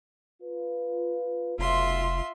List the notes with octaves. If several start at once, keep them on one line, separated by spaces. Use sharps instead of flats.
F4 B4
F1 B1 F4 E5 C6